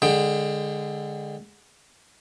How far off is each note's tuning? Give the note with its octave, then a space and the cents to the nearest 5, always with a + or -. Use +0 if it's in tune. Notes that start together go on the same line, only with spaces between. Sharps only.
D3 +0 G#3 -10 G5 +15